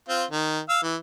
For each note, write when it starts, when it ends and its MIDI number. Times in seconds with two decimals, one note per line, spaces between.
0.08 0.24 60
0.08 0.24 65
0.31 0.60 51
0.69 0.80 77
0.69 0.80 88
0.83 0.96 52